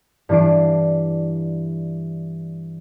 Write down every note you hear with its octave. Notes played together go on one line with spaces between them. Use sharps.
G2 E3 D4 C7 D7